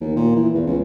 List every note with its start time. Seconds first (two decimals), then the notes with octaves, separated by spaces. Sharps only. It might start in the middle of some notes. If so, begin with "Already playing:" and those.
0.01 D#2
0.16 A#2
0.36 E3
0.55 E2
0.67 C#2